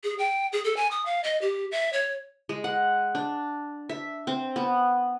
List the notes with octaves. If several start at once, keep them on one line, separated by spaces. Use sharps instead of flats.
G#4
G5
G#4
A4
G#5
D#6
F5
D#5
G4
E5
C#5
G#3
F#5
D4
E5
C4
B3